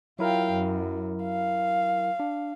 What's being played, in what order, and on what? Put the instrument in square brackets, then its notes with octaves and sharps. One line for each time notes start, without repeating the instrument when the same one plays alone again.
[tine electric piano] F#3 E4 A#4 [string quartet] F4 F5 G5
[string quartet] F#2
F5
[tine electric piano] D4